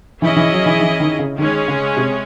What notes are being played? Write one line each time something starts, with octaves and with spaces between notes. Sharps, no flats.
E3 C#4 E4 G#4 D#5
E3
F#3
E3
E3
D#3
C#3
D#3 G#3 C#4 G#4 C#5
C#3
C3